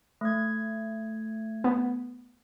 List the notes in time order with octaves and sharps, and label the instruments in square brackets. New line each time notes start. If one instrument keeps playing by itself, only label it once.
[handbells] A3 G#6
[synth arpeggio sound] B3